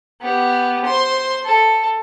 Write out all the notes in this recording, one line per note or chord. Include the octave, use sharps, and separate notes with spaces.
B3 G4
C5 C6
A4